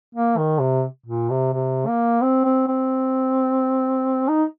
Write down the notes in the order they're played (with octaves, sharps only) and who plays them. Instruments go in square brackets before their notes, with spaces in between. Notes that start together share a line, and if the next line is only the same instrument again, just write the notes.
[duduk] A#3
D#3
C3
A#2
C3
C3
A#3
C4
C4
C4
D#4